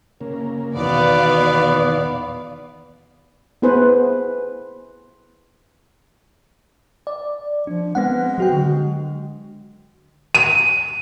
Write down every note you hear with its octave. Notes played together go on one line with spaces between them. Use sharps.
C#3 A#3
E2 B2 D#3 B3 D5 F5
B3 E4 G#4 B4 C5 G#5
D5
F3 D4
G#3 B3 C4 F#5
F#3 F#4 G5
D3
D#7